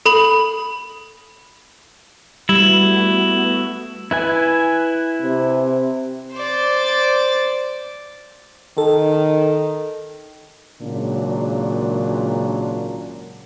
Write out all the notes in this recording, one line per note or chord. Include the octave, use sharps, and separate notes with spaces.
A4 B5 F#7
G3 A3 B3 E4 F#4
E4 B4 G#5
C3
C5 D5
D#3 A4
G#1 A#2 C#3 F#3 D4 A#4